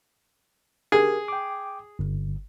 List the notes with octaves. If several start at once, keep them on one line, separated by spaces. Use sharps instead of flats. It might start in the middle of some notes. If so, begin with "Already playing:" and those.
G4 G#4 A#4
G5 D6
G1